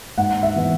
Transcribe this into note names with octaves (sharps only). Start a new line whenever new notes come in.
G#2 F#5
E5
E3 B3